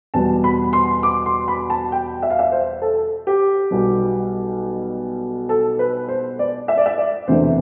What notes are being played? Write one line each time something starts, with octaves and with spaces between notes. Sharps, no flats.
E2 B2 G3 A5
B5
C6
D6
C6
B5
A5
G5
E5
F5
E5
C5
A4
G4
B1 B2 G3
A4
B4
C5
D5
E5
D5
E5
D5
E1 D2 C3 E3 C5